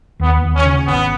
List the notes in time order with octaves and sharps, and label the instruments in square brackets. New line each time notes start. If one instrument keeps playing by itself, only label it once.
[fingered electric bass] D#2 [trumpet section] B3
[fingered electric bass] D#2
[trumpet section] C#4
[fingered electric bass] C#3
[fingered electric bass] G#1 [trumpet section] B3